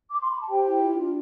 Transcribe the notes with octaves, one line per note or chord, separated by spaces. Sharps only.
D6
C6
B5
A5
G4 C5 G5
E4
F4
D4